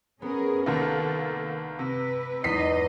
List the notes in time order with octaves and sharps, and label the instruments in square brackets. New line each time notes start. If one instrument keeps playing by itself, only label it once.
[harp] B3 [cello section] C#4 G#4 A#4
[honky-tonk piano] C2 D#3 A#3 [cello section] A4
[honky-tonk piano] C3 [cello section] B4
[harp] E2 [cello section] G#2 D#4 D#5 [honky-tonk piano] B6 C7